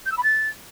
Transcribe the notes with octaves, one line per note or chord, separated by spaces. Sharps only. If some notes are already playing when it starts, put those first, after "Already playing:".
G6
E6
B5
A6